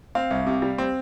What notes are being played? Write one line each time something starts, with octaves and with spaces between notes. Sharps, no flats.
C4 F5
C2
C3
G3
C4